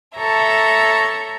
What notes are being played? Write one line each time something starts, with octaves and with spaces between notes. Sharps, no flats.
A4 C#5 E5 A#5